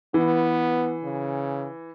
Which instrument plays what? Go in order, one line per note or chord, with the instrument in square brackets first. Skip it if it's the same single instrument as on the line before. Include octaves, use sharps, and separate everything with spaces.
[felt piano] E3 [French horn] B3
[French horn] C#3